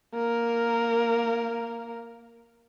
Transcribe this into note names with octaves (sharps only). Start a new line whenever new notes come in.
A#3 A#4